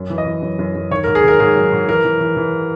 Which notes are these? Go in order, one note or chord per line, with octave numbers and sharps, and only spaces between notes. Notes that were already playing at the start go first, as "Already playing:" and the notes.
Already playing: F#2
E3
D#5
E3
F#2
F#2
F#2
D#3 C#5
A#4
G#2
G#4
D#3 A#4
G#2 G#4
F#3
G#2
E3 A#4
E3
E3
E3